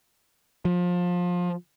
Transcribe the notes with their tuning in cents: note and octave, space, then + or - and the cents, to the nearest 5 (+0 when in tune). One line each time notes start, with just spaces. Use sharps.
F3 +25